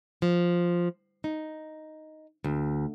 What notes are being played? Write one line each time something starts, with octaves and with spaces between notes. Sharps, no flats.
F3
D#4
D2